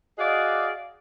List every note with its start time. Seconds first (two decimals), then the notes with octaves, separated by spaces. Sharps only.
0.19 F#4 G#4 D5 D#5 F5